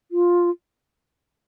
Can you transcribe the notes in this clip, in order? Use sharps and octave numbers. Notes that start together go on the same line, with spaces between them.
F4